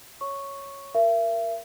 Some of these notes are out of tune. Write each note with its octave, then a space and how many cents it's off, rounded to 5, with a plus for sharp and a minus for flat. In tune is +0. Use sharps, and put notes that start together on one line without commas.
C#5 +0 C#6 +0
A#4 +0 E5 +40